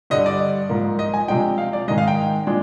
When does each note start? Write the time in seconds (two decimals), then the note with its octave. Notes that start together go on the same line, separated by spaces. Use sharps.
0.10 G2 D3 G3 D#5
0.26 D5
0.69 G#2 F3 A#3
0.99 D#5
1.14 G#5
1.28 C3 F3 G#3 D4 G5
1.58 F5
1.73 D5
1.88 G#2 D#3 G#3 D#5
1.98 F5
2.08 G5
2.47 A#2 G#3 D4